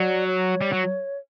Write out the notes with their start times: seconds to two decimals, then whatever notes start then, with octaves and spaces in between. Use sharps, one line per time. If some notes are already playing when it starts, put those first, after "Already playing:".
Already playing: F#3 D5
0.27 C#5
0.61 G3
0.72 F#3